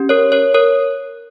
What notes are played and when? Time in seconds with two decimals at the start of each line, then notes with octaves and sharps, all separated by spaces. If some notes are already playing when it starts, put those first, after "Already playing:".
Already playing: C#4 G4
0.09 A#4 C#5
0.32 A#4 C#5
0.54 A#4 C#5